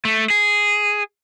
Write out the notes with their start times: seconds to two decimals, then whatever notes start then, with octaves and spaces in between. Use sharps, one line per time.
0.05 A3
0.30 G#4